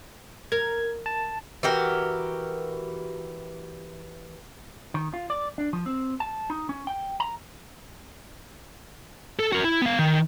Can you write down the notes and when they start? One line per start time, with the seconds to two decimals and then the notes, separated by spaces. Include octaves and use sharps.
0.52 A#4 G#6
1.06 A5
1.63 E3 F#4 G4 A#4
4.94 D#3
5.14 F4
5.30 D5
5.58 D4
5.73 F3
5.86 C4
6.20 A5
6.50 D#4
6.69 C#4
6.87 G5
7.20 A#5
9.39 A4
9.52 F#4 A#4
9.64 E4
9.82 B3 F5
9.99 D#3